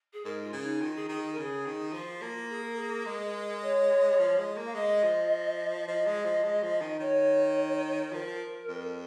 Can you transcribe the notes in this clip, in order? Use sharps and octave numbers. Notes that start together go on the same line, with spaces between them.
G#4
G#2 A#4
F4
C#3
D#4
D#3 F4
G#4
D#3 G#4
G#4
A#4
C#3 G#4
D#3
F3 F4
A#3
G#4
A#4
G#4
G#3 A#4
C#5
F3
G#3
A#3
F5
G#3 D#5
F3
F3 D#5
G#3
F3
G#3
F3
D#3
D#3 C#5
F3 A#4
F2